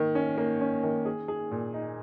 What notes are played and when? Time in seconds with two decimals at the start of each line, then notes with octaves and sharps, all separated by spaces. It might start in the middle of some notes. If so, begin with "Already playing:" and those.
Already playing: D#3 A#3
0.15 C#4
0.38 A#3
0.61 C#4
0.83 D#3
1.05 G#4
1.28 G#4
1.51 A#2
1.74 D#4